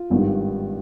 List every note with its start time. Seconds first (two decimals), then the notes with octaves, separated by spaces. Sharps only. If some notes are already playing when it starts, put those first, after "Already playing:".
Already playing: F4
0.10 G#1 G2 D#3 G3